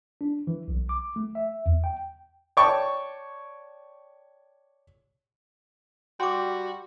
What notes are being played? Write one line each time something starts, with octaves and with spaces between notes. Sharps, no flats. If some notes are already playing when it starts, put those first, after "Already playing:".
D4
E3
B1
D6
A3
E5
E2
G5
C#5 D5 G5 A5 C#6
G3 F#4 G5 C6 D6